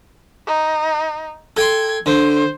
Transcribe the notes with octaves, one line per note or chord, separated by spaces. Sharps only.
D#4
A4 G5 C6 G#6
D3 C5